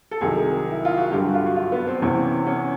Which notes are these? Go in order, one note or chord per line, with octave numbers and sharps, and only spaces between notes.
A4
C2 C3 D#3 F#3 G#4
E4
F4
F#4
G2 D3 F#3 G4
F#4
F4
F#4
F4
B3
C4
E2 C3 E3 C#4
C#4